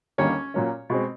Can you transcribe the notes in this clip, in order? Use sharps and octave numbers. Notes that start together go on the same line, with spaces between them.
D#2 D3 G3 A#3 C#4 C#5
A#2 F#3 A#3 C#4
B2 G#3 C4